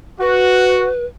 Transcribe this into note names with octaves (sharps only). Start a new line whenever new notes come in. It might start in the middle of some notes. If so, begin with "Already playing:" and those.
F#4 B4